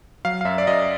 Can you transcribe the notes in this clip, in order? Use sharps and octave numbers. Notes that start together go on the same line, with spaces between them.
F#3 F5
F5
F#2 E5
D5
F#2 D#5